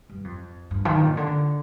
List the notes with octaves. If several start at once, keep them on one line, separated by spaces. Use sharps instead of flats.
G2
F2
G2
D#3
A#2
D3